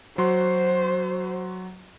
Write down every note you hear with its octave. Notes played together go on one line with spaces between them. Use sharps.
F#3 F#4 C5 C6